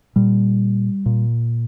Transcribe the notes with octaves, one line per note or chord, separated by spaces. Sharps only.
A#2 G3
A#2